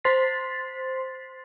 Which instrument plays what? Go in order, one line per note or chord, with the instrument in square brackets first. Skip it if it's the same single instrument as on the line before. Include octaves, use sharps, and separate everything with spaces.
[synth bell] C5 C6 A6 B6 C7